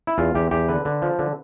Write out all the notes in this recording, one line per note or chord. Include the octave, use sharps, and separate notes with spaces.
E4
E2 F4
E2 G4
E2 G4
D3 B4
D3
F3
D3